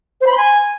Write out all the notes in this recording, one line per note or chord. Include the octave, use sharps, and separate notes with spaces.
C5
B5
C6
G#5